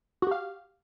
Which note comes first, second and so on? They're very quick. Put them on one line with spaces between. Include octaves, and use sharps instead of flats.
F#4 G4 F5